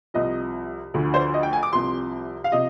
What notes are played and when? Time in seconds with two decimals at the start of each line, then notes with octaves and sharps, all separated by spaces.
0.14 C2 C3 F3 D#5
0.94 D2 D3 F3
1.14 C5
1.34 D#5
1.43 G5
1.53 G#5
1.63 D6
1.72 C2 C3 F3 C6
2.44 F5
2.52 C3 F3 D#5